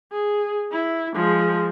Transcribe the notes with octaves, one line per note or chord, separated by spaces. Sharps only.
G#4
E4
F3 G#3